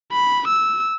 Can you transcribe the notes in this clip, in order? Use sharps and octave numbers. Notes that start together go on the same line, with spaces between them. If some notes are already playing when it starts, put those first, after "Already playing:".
B5
E6